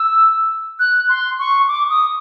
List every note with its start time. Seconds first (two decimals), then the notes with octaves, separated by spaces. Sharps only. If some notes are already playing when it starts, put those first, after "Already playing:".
Already playing: E6
0.80 F#6
1.09 C6
1.39 C#6
1.68 D6
1.90 D#6